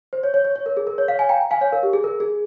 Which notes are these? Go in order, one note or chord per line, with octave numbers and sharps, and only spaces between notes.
C5
C#5
C#5
C#5
C#5
A#4
G#4
A#4
C#5
C#5 F5
F5 G#5
G5 A#5
F5 G#5
C#5 F5
A#4
G4
G#4
A#4
G#4